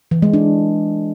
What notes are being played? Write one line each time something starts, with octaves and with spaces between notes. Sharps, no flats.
E3
G#3
D4